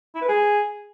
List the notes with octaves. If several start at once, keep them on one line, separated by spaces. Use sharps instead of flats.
E4
B4
G#4